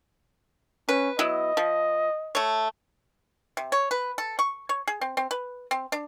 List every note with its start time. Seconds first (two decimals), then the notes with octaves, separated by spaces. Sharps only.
0.89 C#4 B4
1.19 F#3 B3 E4 D#5
1.57 F3
2.35 A3 C#5
3.57 C3
3.72 C#5
3.91 B4
4.18 A4
4.39 C#6
4.69 C#5
4.88 G#4
5.01 C4
5.17 C4
5.31 B4
5.71 C4
5.92 D4